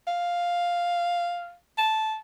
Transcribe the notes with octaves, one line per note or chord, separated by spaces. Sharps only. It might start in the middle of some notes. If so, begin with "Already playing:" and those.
F5
A5